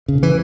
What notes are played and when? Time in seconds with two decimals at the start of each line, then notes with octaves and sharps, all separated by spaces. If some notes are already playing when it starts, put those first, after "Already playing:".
0.08 C#3
0.23 E3